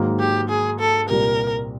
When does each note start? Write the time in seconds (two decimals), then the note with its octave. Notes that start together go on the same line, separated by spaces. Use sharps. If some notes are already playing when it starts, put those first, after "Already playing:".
Already playing: G#2 D#3 F#3 A#3
0.20 G4
0.49 G#4
0.80 A4
1.08 C2 A#2 G3 A#4